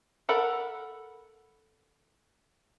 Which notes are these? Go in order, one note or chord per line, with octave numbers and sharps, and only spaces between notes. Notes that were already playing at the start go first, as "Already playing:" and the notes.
A4 A#4 F#5 B5